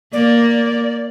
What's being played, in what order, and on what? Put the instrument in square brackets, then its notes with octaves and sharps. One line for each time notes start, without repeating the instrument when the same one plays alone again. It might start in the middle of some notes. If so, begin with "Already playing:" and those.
[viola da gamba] A#3 [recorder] D5